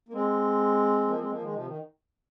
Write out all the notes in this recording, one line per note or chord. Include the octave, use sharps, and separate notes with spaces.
A#3
G#3 C4
F3 A#3
G#3 C4
F3 A#3
D#3 G#3
C3 F3
D#3